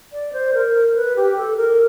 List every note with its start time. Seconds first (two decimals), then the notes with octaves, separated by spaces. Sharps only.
0.12 D5
0.33 C5
0.54 A#4
0.74 A#4
0.95 B4
1.16 G4
1.36 A4
1.57 A#4